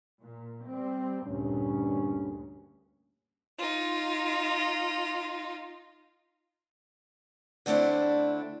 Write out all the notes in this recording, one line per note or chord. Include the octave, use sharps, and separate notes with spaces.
A#2
G3 C4
D2 G2 A#2 C#4
D#4 F4
D3 A3 C4 D4 E4